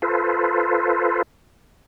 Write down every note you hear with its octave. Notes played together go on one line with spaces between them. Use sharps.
F4 A4 B4 C5